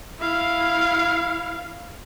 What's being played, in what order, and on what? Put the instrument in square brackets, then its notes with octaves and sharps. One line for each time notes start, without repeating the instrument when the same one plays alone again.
[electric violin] E4 F5